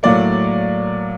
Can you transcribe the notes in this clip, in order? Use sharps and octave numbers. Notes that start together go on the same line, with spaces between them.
A2 F#3 A#3 D5